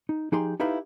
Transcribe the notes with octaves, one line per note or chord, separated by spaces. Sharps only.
D#4
F3 D#4 G4 G#4 C6
D#4 E4 G4 A4 B4 F5